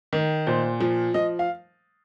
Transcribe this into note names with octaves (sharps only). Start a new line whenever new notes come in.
D#3
A#2 C5
F3
F3 D#5
F5